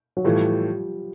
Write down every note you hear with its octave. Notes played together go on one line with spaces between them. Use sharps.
F#3
A2 E3 F3 G3 A3